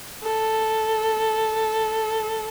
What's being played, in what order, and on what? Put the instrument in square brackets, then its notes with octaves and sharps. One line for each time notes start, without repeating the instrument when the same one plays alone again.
[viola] A4